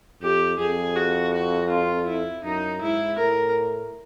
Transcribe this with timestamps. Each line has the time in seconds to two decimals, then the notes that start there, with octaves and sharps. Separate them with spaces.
0.22 F2 G4
0.58 F2 G#4
0.96 F#4
1.33 F#4
1.70 F4
2.07 E4
2.44 F#2 D#4
2.81 G#2 E4
3.18 A2 A#4